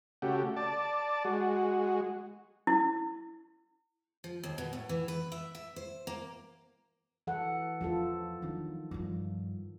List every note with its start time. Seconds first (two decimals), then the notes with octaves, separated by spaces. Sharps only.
0.22 C#3 A3 F#4 G4
0.56 D5 A5
1.25 G#3 F#4
2.67 E4
4.24 F3
4.43 D#2
4.58 B2
4.73 A2
4.89 E3
5.08 B4
5.32 E5
5.55 E5
5.76 C5
6.07 A#3
7.27 E3 A4 F#5
7.81 E2 F3 F4 A4
8.42 D#3 F#3 D4
8.91 G2 F3